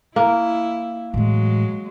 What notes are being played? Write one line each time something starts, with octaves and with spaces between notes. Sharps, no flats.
A#3 E4
A2 E3 F#3 G#3